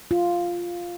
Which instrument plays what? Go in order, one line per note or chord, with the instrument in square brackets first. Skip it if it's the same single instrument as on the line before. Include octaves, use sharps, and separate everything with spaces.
[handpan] F4